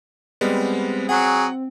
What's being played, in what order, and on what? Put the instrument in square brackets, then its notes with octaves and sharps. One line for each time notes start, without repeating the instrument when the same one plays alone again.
[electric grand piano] G3 G#3 B3 [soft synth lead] C4
[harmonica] F#3 G#4 [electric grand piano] F#5